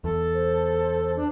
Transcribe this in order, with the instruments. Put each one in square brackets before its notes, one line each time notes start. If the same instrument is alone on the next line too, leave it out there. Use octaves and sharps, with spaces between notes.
[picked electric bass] E2 [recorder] A4
[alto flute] C5
[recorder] D4